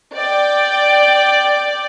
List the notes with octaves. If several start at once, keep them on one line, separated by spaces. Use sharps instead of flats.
D5 G5